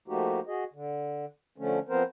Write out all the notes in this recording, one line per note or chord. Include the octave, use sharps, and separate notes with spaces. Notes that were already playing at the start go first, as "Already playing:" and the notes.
F3 A3 A#3 D#4 F#4 G4
F#4 G#4 D#5
D3
D3 F3 A3 C#4
F3 B3 C4 A#4 C5